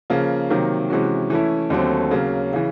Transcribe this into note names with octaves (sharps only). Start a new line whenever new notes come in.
C#3 F3 A#3
C3 D#3 F#3 A#3
C3 E3 G#3 C#4 F#4
E3 A3 C#4 E4
D#2 D3 F#3 A3 C4
C#3 F#3 A#3
C#3 E3